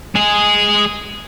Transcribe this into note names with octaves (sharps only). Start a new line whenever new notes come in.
G#3 G#4